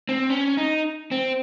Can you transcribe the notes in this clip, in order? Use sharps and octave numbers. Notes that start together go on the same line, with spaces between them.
C4
C#4
D#4
C4